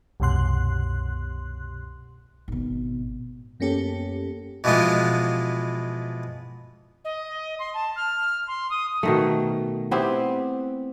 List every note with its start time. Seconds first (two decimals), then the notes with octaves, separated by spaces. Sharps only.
0.20 C2 F#2 B2 C6 F#6
2.48 G#1 B2
3.60 F#2 A#3 B3 C#4 G4 A4
4.64 B2 E3 F3 G#3 B3 F4
7.04 D#5
7.59 C6
7.74 A5
7.96 F6
8.47 C6
8.70 D#6
9.03 B2 D#3 A3
9.91 B3 C4 E4 G4